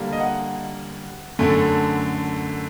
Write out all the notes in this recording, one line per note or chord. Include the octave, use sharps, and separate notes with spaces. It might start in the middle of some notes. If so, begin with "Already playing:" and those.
Already playing: D3 G3 A#3
D#5
F#5
F#2 D3 A3